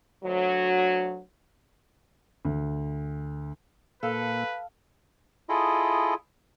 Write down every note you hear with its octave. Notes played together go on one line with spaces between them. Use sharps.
D2 F#3
D2
A#2 A#3 A4 B4 F5
E4 F4 G#4 A4 D#5